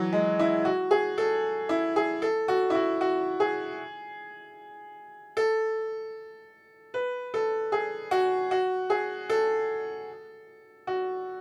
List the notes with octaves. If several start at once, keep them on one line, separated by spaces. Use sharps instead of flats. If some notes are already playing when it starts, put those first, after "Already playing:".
Already playing: E3 F#3
G#3
E4
F#4
G#4
A4
E4
G#4
A4
F#4
E4
F#4
F#4
G#4
A4
B4
A4
G#4
F#4
F#4
G#4
A4
F#4